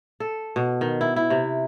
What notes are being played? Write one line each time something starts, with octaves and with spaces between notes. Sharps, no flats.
A4
B2
D#3
E4
E4
C3